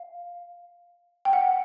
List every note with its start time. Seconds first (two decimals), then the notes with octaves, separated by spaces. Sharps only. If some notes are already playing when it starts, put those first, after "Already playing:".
Already playing: F5
1.25 G5
1.33 F#5